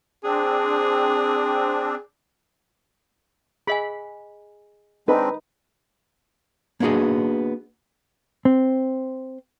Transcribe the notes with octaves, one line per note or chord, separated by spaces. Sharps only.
C4 D4 G#4
G#4 D#5 G#5 B5
G#3 C4 D4 D#4 B4
A#3 B3 D4 F#4 G#4 D#5
C4